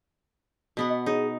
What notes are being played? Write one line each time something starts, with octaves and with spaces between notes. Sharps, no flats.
B2 B3 F#5
D#5
D#4 G#4